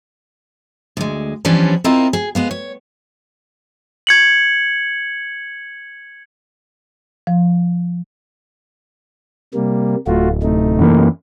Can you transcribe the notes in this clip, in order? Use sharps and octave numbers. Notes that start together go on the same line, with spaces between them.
D2 G#3
E3 F3 G3 B3 C#4 D4
C4 E4 F4 A#4 D#5
G#4
G#3 B3 F5
C#5
G#6 C#7 F#7
F3
C3 G3 A#3
D1 A3 F4 F#4
C3 A3 D#4
F#2 E3 A#3